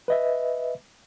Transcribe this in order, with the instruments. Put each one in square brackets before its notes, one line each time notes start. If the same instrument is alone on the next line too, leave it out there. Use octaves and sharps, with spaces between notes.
[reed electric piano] B4 D#5 E5